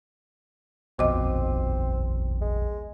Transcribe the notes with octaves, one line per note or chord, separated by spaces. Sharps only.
D#1 A#1 F2 B2 C4 D#5 D6
G#3